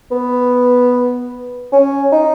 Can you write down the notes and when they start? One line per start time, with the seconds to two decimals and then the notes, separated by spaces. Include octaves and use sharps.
0.11 B3
1.72 C#4
2.12 D#4